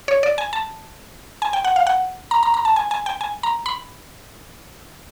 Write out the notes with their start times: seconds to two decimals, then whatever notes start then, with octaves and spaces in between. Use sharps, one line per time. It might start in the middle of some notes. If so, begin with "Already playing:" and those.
0.08 C#5
0.23 D5
0.38 G#5
0.53 A5
1.42 G#5
1.53 G5
1.64 F#5
1.76 F5
1.87 F#5
2.31 A#5
2.43 A#5
2.54 A#5
2.65 A5
2.76 G#5
2.91 G#5
3.06 G5
3.21 G#5
3.43 A#5
3.66 B5